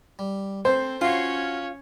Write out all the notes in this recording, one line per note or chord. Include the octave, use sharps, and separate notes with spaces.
G3
C4 A4 C5
C#4 F4 F#4 C#5 F5 C6